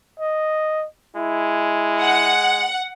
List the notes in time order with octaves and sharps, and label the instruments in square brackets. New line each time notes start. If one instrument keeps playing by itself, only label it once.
[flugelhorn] D#5
[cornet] G#3 [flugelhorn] E4
[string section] F#5